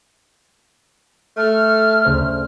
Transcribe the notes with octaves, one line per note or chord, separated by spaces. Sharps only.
A3 F6
D2 C#3 C5